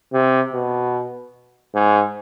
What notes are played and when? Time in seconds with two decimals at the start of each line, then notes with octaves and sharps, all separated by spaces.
0.13 C3
0.53 B2
1.74 G#2